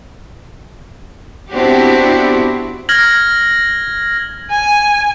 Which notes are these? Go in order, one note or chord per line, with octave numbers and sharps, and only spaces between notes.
B3 C4 D4 E4 F#4 G4
F6 G#6 A#6 F#7
G#5